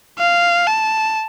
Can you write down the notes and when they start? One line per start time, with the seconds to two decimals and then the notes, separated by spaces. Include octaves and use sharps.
0.19 F5
0.67 A5